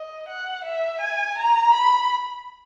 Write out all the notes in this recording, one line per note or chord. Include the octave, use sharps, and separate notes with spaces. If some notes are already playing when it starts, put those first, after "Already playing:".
Already playing: D#5
F#5
E5
G#5
A#5
B5